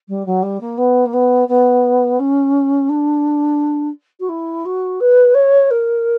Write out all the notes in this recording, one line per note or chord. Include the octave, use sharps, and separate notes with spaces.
G3
F#3
G3
A#3
B3
A#3
B3
B3
C#4
D4
F#4
E4
F#4
B4
C#5
A#4